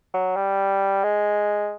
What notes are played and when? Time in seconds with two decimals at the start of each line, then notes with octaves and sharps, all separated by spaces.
0.14 F#3
0.36 G3
1.04 G#3